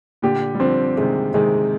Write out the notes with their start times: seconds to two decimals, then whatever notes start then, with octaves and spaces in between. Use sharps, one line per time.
0.22 A#2 D3 G4
0.55 G3
0.60 D3 F3 C4
0.97 C3 D#3 G#3
1.34 C3 D#3 G#3